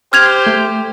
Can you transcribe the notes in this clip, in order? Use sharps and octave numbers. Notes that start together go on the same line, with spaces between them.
G4 C5 F6 G#6 F7
A3